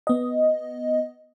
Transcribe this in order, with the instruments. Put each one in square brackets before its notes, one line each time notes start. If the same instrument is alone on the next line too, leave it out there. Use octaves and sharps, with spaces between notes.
[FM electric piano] B3 D#5